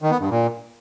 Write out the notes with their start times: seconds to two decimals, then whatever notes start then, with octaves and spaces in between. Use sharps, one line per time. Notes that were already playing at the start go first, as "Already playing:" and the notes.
0.01 D#3
0.11 B3
0.20 G2
0.30 A#2